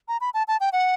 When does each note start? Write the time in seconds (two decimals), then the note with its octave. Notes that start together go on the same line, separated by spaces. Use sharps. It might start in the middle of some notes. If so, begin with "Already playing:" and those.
0.08 A#5
0.21 B5
0.34 A5
0.48 A5
0.60 G5
0.73 F#5